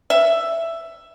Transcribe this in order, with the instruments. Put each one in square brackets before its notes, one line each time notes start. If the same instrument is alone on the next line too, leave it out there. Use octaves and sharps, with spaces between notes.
[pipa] E5